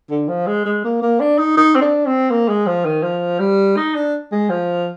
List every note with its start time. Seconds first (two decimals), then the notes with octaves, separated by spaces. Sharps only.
0.11 D3
0.29 F3
0.47 G#3
0.65 G#3
0.84 A#3
1.02 A#3
1.20 D4
1.38 D#4
1.57 D#4
1.75 C4
1.82 D4
2.06 C4
2.30 A#3
2.49 G#3
2.67 F3
2.85 D#3
3.03 F3
3.40 G3
3.77 D#4
3.95 D4
4.32 G#3
4.50 F3